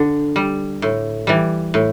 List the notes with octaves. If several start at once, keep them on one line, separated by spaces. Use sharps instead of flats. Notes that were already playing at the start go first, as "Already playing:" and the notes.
Already playing: D3
G3
A2
E3 G3
A2